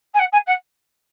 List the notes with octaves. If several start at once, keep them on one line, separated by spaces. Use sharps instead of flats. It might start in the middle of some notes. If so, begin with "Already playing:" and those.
G#5
F#5
G#5
F#5